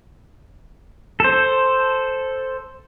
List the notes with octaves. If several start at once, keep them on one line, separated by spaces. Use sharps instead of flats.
A4 C5